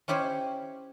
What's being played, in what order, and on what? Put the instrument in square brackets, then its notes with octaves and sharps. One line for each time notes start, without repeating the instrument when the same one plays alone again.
[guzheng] C#4 E4 G4 C5 C#5